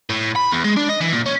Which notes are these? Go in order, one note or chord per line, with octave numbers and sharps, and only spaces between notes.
A2
B5
E2
G#3
D4
D#5
E3
A#2
C#4